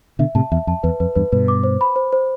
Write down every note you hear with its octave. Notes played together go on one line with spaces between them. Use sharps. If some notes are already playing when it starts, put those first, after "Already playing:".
B2 D3 E5
A2 C3 A5
E2 E5
F2 A5
E2 B4
F2 B4
E2 G2 B4
G2 B2 B4
D6
C5
B5
C5
C5